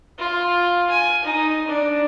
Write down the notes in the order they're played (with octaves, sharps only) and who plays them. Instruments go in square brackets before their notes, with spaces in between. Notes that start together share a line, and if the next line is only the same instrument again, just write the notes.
[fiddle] F4
G#5
D#4
D4